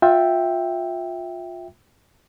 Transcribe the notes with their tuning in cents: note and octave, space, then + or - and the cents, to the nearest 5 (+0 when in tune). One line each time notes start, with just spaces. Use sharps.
F4 +25 E5 +0 G5 +0